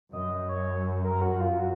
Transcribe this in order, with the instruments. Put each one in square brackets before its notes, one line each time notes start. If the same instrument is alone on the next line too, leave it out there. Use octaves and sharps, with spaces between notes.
[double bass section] F#2 [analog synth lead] D#5
[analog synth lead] C#5
A#4
F#4
F4
F#4